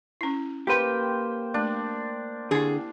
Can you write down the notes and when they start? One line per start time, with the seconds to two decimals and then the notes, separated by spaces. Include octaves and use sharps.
0.21 C#4 E4
0.67 A#3 G4 B4 C5 G5
1.54 A3 D4
2.51 D3 C4 E4 G#4